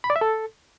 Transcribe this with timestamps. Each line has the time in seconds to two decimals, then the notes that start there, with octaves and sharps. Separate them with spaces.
0.04 B5
0.10 D5
0.16 E5
0.21 A4